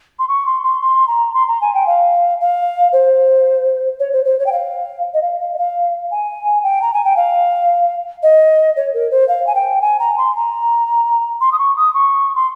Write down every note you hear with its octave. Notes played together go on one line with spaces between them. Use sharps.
C6
C#6
C6
C6
C6
A#5
C6
A#5
G#5
G5
F5
F5
C5
C#5
C5
C5
C#5
G5
F5
D#5
F5
F5
D#5
F5
G#5
G5
A#5
G#5
G5
F5
D#5
C#5
A#4
C5
F5
G#5
G5
G#5
A#5
C6
A#5
C6
D#6
C#6
D#6
C#6
C6